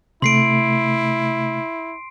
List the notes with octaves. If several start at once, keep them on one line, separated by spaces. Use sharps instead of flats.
C3 A3 E4 C6 C7 D7